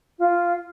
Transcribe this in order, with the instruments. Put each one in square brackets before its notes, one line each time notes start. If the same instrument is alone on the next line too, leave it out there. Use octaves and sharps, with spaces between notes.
[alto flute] F4